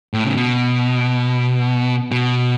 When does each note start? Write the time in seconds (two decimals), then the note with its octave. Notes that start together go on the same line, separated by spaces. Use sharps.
0.14 A2
0.25 C#3
0.36 B2
2.11 B2